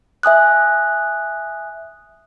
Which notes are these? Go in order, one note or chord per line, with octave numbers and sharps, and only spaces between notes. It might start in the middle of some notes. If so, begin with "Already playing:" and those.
E5 G#5 D#6 F#6